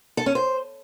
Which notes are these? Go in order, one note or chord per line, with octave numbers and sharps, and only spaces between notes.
A4
C#4
C5